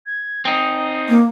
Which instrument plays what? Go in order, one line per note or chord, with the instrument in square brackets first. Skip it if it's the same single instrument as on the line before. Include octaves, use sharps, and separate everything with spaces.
[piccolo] G#6
[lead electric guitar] C4 D#4 [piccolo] D#6
[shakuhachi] A#3